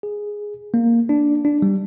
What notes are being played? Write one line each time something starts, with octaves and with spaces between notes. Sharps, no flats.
G#4
A#3
D4
D4
G3